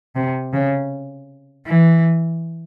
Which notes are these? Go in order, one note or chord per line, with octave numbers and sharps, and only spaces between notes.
C3
C#3
E3